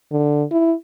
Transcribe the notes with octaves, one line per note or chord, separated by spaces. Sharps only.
D3
E4